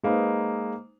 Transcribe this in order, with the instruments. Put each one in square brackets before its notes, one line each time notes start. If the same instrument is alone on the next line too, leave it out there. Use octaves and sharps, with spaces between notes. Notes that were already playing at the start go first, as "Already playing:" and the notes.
[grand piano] G#3 A#3 D#4 B4 C5